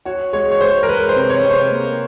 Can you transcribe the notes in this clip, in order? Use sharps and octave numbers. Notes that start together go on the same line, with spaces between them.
F#4 C#5
G#3 C#5
C#5
G#3 C5
A#4
G#3 B4
C5
C3
C#5
C3
C5
A#3